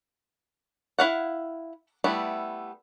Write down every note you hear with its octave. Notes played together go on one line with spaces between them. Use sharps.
E4 F5 F#5
G3 A3 B3 E4